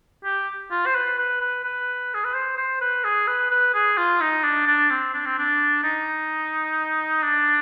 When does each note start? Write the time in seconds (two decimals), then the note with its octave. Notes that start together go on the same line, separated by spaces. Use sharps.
0.24 G4
0.71 F4
0.86 C5
0.95 B4
1.18 B4
1.41 B4
1.64 B4
2.14 G#4
2.24 B4
2.34 C5
2.57 C5
2.81 B4
3.04 G#4
3.28 B4
3.51 B4
3.74 G#4
3.98 F4
4.21 D#4
4.44 D4
4.67 D4
4.90 C4
5.14 D4
5.26 C4
5.38 D4
5.84 D#4
7.24 D4